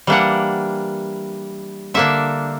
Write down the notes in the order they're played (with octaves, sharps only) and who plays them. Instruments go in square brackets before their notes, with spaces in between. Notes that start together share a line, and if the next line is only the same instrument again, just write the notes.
[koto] E3 G3 A#3 D4 F#5
D3 A#3 D4 E5